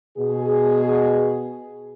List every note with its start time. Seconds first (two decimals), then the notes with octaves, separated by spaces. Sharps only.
0.17 B2 G#4